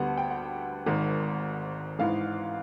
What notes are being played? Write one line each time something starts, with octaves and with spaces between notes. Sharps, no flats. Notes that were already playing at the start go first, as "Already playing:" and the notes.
Already playing: D2 D3 G3 B3 F#5
G5
F#5
G#1 G#2 D#3
A1 G#2 E3 F5